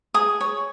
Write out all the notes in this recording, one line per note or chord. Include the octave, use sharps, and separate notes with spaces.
G#4 D#6
C#5